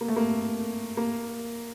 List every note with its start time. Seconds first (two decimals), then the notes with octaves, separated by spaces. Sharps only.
0.01 A#3
0.08 A3
0.16 A#3
0.97 A#3